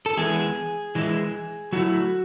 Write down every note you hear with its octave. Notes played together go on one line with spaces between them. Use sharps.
A4
E3 G#3 B3 E4 G#4
E3 G#3 B3 E4
F#3 A3 C#4 E4 F#4